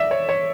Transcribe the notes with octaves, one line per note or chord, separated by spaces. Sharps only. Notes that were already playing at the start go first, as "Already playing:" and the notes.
Already playing: D5 E5
C#5
C#5